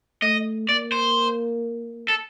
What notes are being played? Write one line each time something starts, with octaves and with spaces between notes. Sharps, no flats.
A3 D#5
A#3 D5
C5
A4